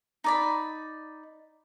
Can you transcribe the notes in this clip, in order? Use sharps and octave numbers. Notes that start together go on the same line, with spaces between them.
D#4 D5 B5